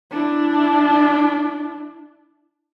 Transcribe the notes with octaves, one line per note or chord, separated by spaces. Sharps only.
D4 E4